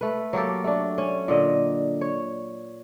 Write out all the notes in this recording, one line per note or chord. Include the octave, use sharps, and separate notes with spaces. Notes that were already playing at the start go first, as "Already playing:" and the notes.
A3 B4
F#3 A#3 G4 A4
A3 D4
C#4
A#2 D3 D#5
C#5